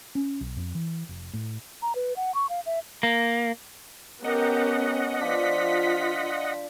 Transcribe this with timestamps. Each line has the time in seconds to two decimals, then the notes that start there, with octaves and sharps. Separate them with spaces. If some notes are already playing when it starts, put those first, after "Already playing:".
0.15 C#4
0.41 B1
0.57 F2
0.75 E3
1.09 F1
1.33 A2
1.82 A#5
1.95 B4
2.16 F#5
2.35 C#6
2.50 F5
2.66 E5
3.03 A#3
4.24 B3 C#4 G4 A#4 D#5 F#5
5.21 F3 D4 F4 B6